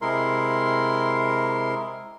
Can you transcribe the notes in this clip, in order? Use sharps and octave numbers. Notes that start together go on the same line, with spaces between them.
C3 G#3 E4 A#4 C6